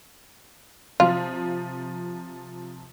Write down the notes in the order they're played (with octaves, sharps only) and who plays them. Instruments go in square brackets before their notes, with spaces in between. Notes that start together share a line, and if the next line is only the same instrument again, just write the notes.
[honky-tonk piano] C3 F3 [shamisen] F4